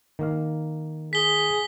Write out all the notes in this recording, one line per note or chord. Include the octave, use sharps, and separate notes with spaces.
D#3 A#3 F5
G#4 B6 G7